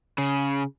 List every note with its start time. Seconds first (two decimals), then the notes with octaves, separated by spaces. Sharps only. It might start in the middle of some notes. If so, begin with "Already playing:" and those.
0.18 C#3